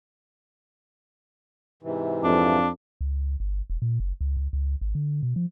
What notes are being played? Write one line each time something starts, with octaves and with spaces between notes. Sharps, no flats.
G#2 C3 E3
F2 D4
C#2
G1
E1
A#2
F#1
C#2
C#2
C#2
G#1
D3
B2
F3